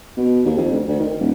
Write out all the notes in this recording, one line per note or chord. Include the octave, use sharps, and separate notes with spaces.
B2
D#2
F2
D2
D2
D#3
D#1